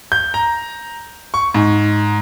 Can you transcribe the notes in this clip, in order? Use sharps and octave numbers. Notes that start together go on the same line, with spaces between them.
G6
A#5
C#6
G#2